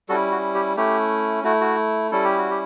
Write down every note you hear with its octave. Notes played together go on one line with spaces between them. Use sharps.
G3 C#4 E4 F#4 A4
F#4
G4
A3 C#4 E4 G4
A3 E4 F#4
F#4
G3 C#4 E4 A4
G4
F#4
G4